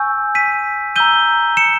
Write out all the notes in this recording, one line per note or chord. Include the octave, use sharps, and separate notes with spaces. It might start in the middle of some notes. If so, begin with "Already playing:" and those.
Already playing: G#5 C#6 E6 G6
B6 D#7
A#5 E6 G6 D#7 G7
C#7 E7